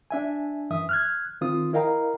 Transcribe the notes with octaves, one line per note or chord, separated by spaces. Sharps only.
D4 E5 G#5
F#2 E3 E5 D#6
F6 F#6 G#6
D#3 C4 F4 D#6
E4 A#4 D#5 F5 G5 A#5